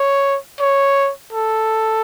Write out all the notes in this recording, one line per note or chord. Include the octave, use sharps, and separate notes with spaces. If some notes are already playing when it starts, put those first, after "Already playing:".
Already playing: C#5
C#5
A4